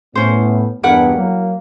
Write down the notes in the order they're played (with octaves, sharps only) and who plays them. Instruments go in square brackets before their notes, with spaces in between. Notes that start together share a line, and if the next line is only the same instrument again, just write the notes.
[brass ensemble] A2 B3 [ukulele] C#4 C5
[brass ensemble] E2 G2 [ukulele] E4 A#4 F#5
[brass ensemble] F#3 A#3